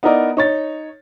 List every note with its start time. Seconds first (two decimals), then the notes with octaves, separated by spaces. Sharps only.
0.03 B3 D#4 E4 A#4 D5 D#5
0.37 D#4 C#5 A6